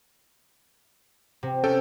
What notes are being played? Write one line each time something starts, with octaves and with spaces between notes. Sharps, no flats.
C3
C#4 A4 G5